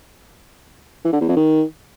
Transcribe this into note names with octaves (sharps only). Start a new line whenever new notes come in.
E3
D3
E2
F2
D#3